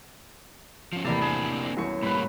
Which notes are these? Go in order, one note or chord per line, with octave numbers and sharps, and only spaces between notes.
F3 C#4
E2 A2 C3 D#3 G3 A#3 A5
A#3 C4 D4 G#4
C2 F#2 E3 B3 C#6
A2 G3 A#3 B4 B5